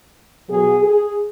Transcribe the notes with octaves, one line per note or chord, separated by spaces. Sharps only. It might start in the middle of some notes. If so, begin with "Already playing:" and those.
B2 F#3 G#4
G#4